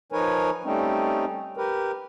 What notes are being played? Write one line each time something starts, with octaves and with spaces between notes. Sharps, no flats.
F3 D#4 A#4 B4 C#5 G#5
G3 A3 C4 C#4 D#4
G4 A#4 B4